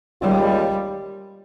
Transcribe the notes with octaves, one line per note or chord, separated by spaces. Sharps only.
D#2 D#3 G3 G#3 C#4 F4